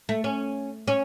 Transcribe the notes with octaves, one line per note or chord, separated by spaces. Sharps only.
A3
C#4
C#4